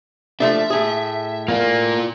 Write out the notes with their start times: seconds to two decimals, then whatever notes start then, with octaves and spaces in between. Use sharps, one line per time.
0.40 F3 A3 D4 E5
0.70 A2 G#4
1.48 A#3 F4 D5